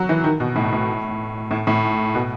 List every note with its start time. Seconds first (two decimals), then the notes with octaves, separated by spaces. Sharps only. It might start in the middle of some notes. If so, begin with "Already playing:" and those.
Already playing: F#3
0.09 E3
0.24 D#3
0.40 B2
0.56 A2
0.72 A2
1.51 A2
1.67 A2
2.15 B2